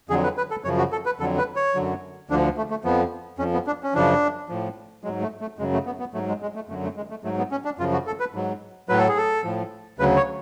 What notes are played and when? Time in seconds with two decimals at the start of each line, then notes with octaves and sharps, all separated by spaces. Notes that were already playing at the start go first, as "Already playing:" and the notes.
0.10 F2 D3 F#3 G#4
0.23 B4
0.37 B4
0.51 A4
0.64 F#2 C#3 F3 C#5
0.78 F#4
0.92 A4
1.06 B4
1.20 F2 D3 F#3 A4
1.38 B4
1.56 C#5
1.75 F#2 D3 F#3
2.30 D2 D3 F3 D4
2.57 A3
2.70 A3
2.84 F2 F3 B3
3.39 F2 C#4
3.44 F3
3.53 B3
3.67 D4
3.83 C#4
3.94 F#2 C#3 F3 D4
4.49 A2 F3
5.04 G#2 F#3 G#3
5.22 A3
5.41 A3
5.59 F#2 C#3 F#3 G#3
5.73 A3
5.86 B3
6.00 B3
6.14 G#2 F#3 A3
6.28 G#3
6.42 G#3
6.55 A3
6.69 F#2 D3 F#3 A3
6.83 A3
6.96 G#3
7.10 A3
7.24 G#2 F#3 A3
7.38 B3
7.51 C#4
7.65 D4
7.79 F#2 C#3 F3 F4
7.92 F#4
8.07 A4
8.20 B4
8.34 G#2 F#3
8.89 A2 F#3 B4
8.98 A4
9.08 G#4
9.17 A4
9.44 A2 F3
9.99 D2 C#3 F#3 B4
10.17 C#5